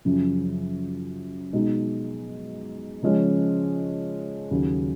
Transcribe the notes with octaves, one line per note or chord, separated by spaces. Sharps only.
F#2 C#3 F3
B2 G#3 D#4
C#3 F3 G#3 C#4
D#2 C#3 F#3